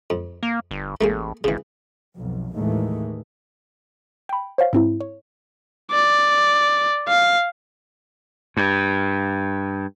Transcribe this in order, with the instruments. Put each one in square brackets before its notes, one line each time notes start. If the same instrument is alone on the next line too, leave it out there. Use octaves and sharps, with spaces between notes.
[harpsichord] F2
[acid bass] A#3
G1
[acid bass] A1 [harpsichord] A3 A#3 G#4
[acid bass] G#1 [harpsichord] C#3 E3
[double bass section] B1 F2
D#2 A2 D#3 E3 G#3 A3
[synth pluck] G5 B5
C5 C#5 F5
G#2 C4 E4
C#5
[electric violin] D5
F5
[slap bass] G2